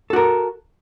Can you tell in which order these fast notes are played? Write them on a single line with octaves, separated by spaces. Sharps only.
A4 F#4 A#4